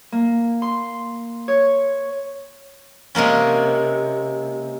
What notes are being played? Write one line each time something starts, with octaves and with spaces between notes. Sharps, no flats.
A#3
C6
C#5
C3 G#3 A#3 C#4